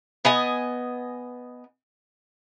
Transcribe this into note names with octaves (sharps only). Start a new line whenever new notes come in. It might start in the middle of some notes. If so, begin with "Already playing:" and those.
B3 D#5 G#5